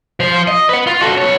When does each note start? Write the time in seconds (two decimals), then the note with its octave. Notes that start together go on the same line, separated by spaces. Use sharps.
0.20 F3 C5
0.48 D#5
0.69 B4 F#5
0.87 F4
1.02 F#4 A4
1.18 B3 C#5